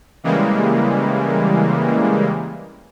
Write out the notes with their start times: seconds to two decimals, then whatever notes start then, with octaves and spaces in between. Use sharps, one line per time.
0.24 C#3 E3 G3 G#3 A#3